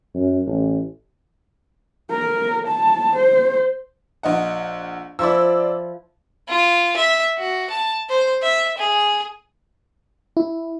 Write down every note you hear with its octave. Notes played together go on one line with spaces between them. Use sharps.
F#2
A1
A#4
A5
C5
A#1 D#5 F#5
F3 E4 D5 C6 E6
F4
E5
F#4
A5
C5
E5
G#4
E4